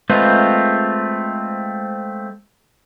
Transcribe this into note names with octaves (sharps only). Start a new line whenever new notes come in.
G#3 A3 C4 F4 B4 C5